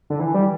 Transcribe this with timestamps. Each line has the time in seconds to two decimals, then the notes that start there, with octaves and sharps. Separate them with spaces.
0.10 D3
0.20 E3
0.34 G3